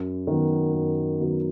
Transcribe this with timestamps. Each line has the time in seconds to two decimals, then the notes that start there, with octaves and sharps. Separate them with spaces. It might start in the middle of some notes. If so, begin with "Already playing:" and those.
Already playing: F#2
0.27 D#3 F#3 B3
0.74 F#2
1.20 D#3 F#3 B3